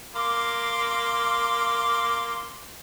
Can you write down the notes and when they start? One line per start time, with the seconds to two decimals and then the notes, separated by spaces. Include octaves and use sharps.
0.16 A#3 C6 D6